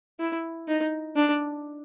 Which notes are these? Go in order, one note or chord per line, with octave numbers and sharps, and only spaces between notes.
E4
D#4
D4